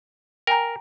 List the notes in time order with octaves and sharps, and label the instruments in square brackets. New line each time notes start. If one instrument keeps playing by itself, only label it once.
[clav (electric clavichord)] A#4 [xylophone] G5 G#5 A#5